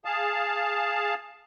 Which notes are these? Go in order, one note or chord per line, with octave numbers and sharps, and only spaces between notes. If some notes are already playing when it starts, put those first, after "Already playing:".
G#4 F5 A5